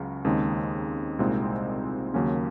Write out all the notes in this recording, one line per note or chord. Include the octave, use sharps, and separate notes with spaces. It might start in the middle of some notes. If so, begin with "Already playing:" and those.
Already playing: C#2 C#3 F#3
D#2 C#3 G#3 C4 D#4
C2 A#2 G#3 C4 D#4
D#2 C#3 F#3 A#3 C#4